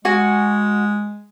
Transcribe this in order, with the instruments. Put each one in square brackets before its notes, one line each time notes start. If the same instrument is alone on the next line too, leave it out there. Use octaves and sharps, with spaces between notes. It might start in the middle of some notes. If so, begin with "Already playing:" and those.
[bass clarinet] G#3 [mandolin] F#4 G#5